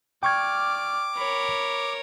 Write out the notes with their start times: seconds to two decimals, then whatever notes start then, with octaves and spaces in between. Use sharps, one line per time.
0.23 D5 G5 C#6 D6 F6 G#6
1.17 A#4 C#5 B5